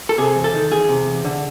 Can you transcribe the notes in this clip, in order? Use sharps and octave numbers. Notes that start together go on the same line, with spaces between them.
A4
C3 G#4
E2
A4
D#3
E2 G#4
C3
E2
D3